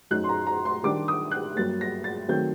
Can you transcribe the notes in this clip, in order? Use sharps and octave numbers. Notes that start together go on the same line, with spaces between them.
F#2 F#3 A3 D#4 F#6
C6
A#5
A#5
C6
D#3 G3 D4 D6
D#6
F#6
G2 F#3 A#3 A6
A#6
A6
D#3 F#3 A3 C4 G6